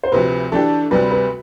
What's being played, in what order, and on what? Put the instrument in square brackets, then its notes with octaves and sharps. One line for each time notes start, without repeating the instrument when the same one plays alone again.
[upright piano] C5
[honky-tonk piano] D2 C3 F3 [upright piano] B4
[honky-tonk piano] E3 A3 D4 G4 [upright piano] A4
[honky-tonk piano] D2 C3 G3 [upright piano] B4
[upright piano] B4